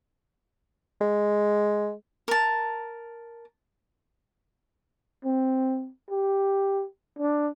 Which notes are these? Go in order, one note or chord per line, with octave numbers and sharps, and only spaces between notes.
G#3
A#4 A5
C4
G4
D4